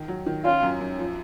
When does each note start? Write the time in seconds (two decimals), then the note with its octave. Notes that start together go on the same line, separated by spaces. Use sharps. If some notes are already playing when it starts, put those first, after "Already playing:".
Already playing: D#3
0.08 F#3
0.26 D#3
0.45 C#4 F4
0.63 F#2
0.81 F#2
0.99 F3